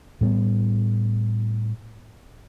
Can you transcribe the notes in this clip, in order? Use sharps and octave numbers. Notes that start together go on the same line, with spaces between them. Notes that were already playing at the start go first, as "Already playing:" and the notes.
A2 G3 B3